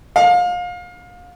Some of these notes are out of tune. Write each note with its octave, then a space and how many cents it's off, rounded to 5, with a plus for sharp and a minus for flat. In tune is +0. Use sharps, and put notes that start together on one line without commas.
F5 +30